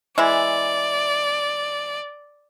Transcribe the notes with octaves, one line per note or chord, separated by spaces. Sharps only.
E3 G#3 E4 D5